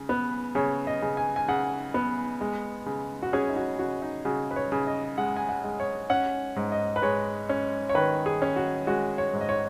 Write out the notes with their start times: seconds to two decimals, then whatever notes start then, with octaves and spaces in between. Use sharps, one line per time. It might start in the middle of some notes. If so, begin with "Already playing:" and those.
Already playing: C#3
0.09 B3
0.55 C#3 C#5
0.87 D#5
1.02 C#3
1.17 G#5
1.36 G#5
1.48 C#3 F#5
1.94 B3
2.41 G#3
2.86 C#3
3.22 F#4
3.33 C#4 G#4
3.50 D#4
3.56 F#4
3.79 C#3 F#4
4.02 D#4
4.25 C#3 F#4
4.51 B4
4.56 C#5
4.72 C#3
4.87 D#5
5.18 G#3 F#5
5.36 G#5
5.49 F#5
5.64 G#3
5.80 C#5
6.10 C#4 F#5
6.56 G#2
6.72 D#5
6.96 B4
7.02 G#3 C#5
7.49 C#4
7.89 C#5
7.95 D#3 B4
8.26 G#4
8.42 C#4
8.56 F#4
8.87 G#3 F#4
9.18 C#5
9.33 G#2
9.41 D#5
9.49 C#5